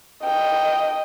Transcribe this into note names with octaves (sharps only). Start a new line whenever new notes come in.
D#5 G5